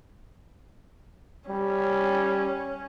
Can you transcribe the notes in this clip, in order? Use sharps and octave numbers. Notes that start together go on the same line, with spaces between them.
G3 C#4